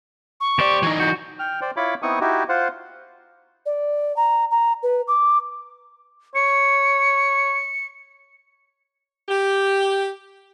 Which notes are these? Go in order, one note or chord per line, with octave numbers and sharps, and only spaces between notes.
C#6
D#2 G4 C5 D5
E3 D#4
F#4 G6
G5 F6
C5 D5 G5
E4 F4 C#5 B5 D6
B3 C4 D#4 E4 C#6 D#6
D#4 E4 F#4 G4
F4 C5 F#5
D5
A#5
A#5
B4
D6
C#5 C#7
G4